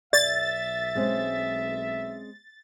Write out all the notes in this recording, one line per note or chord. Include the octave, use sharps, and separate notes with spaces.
B1 D5 E5 A6
G#3 C4 C#4